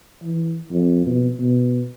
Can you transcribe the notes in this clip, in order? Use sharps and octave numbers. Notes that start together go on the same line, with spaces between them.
E3
F2
B2
B2